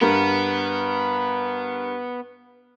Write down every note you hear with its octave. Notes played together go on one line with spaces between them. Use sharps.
G2 B3 A#4